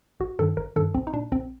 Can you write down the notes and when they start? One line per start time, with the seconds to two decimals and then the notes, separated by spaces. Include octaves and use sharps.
0.20 A1 F#4
0.39 G2 D#3 A4
0.57 A1 A#4
0.76 G2 D#3 A4
0.94 A#1 C4
1.07 D#4
1.13 A#2 D4
1.32 A#1 C4